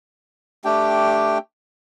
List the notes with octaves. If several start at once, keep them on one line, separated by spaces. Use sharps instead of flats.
A3 D4 G4 G5